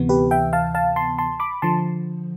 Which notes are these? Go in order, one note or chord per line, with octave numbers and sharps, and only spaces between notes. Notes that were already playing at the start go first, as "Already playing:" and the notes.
Already playing: D2 C3 E3 B3
G4 B4
E5 G5
F5 A5
F5 A5
A5 C6
A5 C6
B5 D6
D3 F3 A5 C6